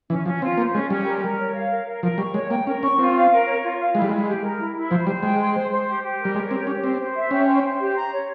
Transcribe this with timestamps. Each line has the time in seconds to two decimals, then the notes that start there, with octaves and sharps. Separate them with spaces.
0.10 E3 C#4
0.26 F3 C#4
0.42 C4 F4
0.58 A#3 C5
0.74 G#3 C#4
0.90 G3 C#4
1.06 A#4
1.22 A#4
1.39 C#5
1.55 F5
1.70 A#4
1.86 A#4
2.03 F3 A#4
2.18 G3 C#6
2.34 G#3 C#5
2.50 A#3 G5
2.66 C#4 A#4
2.82 C#4 C#6
2.98 C4 F4
3.14 F5
3.31 A#4
3.47 C#5
3.63 F4
3.79 F5
3.95 G#3 E4
4.02 G3
4.09 G#3 E4
4.27 G4
4.43 A#4
4.59 E4
4.75 E4
4.90 F3 C5
5.07 G3 C5
5.23 G#3 G5
5.39 C6
5.55 C5
5.71 C5
5.87 G4
6.03 G4
6.19 A#4
6.25 G3
6.35 G#3 C#5
6.51 C4 G4
6.67 C#4 G4
6.83 C4 C5
7.00 C5
7.14 E5
7.31 C#4 G5
7.47 C5
7.62 C5
7.79 G4
7.95 A#5
8.12 C#5